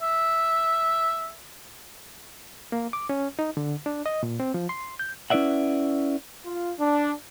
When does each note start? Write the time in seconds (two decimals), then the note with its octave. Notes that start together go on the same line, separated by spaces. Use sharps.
0.02 E5
2.72 A#3
2.93 D6
3.09 C#4
3.39 D#4
3.57 D3
3.86 D4
4.06 D#5
4.23 A#2
4.40 C4
4.54 F3
4.69 C6
4.99 G6
5.30 C#4 E4 B4 D5 E5 F#5
6.45 F4
6.80 D4